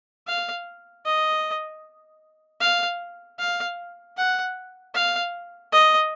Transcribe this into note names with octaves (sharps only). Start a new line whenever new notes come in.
F5
D#5
F5
F5
F#5
F5
D#5